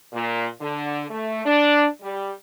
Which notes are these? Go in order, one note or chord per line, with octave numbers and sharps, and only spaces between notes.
A#2
D3
A3
D4
G3